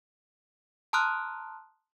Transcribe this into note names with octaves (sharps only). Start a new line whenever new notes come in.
A5 A#5 C6 D#6 F6 F#6